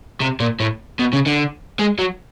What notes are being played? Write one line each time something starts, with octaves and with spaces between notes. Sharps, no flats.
C3
A#2
A2
B2
C#3
D3
G#3
F#3